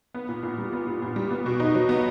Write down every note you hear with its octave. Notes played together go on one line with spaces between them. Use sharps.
B3
A#2
A#2
G3
B3
A#2
A#2
G3
B3
B2
D#4
F#3
B3